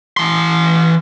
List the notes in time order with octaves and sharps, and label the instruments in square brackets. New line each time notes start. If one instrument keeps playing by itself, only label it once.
[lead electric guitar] E3 C6